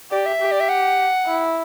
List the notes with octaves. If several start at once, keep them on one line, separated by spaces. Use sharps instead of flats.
G4 D5
E5
G4
D5
E5
F#5
E4